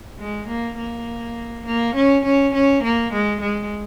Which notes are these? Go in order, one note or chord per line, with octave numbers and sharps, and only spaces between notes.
G#3
A#3
A#3
A#3
C#4
C#4
C#4
A#3
G#3
G#3